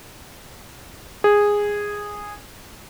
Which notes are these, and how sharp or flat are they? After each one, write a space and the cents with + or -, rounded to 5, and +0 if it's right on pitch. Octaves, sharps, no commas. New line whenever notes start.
G#4 -10